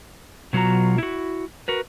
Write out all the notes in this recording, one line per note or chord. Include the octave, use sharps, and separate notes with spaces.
B2 F#3 F4 F#4 A#5
E4 F#4
F#4 A#4 B4